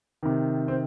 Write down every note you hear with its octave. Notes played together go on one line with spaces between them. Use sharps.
C3 D#3
C4